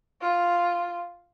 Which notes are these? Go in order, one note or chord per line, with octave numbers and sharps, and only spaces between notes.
F4